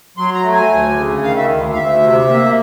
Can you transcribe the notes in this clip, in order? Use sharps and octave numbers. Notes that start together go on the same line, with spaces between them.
F#3 C6
A#5
A3
G#5
D2
C#3
D#3 F5
E5
D2
F5
D2 E5
C3
A#3